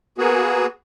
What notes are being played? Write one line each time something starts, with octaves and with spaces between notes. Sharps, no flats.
A#3 B3 F#4 G#4